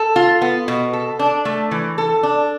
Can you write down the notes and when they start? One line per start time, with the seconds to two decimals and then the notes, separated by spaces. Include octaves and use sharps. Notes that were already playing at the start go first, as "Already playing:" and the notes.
Already playing: A4
0.16 F4
0.42 B3
0.68 B2
0.93 A4
1.19 D4
1.45 A3
1.71 E3
1.98 A4
2.23 D4